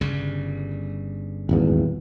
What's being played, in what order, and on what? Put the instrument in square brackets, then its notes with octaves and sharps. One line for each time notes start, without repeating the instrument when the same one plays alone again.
[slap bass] G1 C#3 G3
[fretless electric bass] D#1 G#1 E2